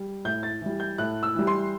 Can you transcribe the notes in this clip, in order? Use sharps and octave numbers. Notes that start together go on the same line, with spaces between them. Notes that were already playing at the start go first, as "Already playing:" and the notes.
Already playing: G3
A2 G6
A6
E3 G3
G6
A2 F#6
E6
E3 G3
C6